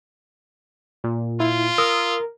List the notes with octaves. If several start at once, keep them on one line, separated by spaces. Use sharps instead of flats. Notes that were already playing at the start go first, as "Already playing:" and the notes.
A#2
E4 F4
A#4 D#6 E6